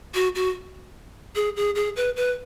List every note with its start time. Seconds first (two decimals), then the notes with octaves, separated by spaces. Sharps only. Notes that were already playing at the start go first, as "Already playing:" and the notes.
0.14 F#4
0.35 F#4
1.36 G#4
1.56 G#4
1.75 G#4
1.96 B4
2.16 B4